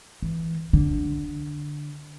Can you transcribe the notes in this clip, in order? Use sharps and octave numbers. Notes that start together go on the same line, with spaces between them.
E3
D3